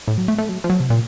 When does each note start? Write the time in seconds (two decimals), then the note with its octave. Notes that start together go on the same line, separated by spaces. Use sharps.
0.08 A2
0.18 F#3
0.28 A3
0.38 A3
0.49 F#3
0.64 F3
0.70 F#3
0.80 C3
0.90 A#2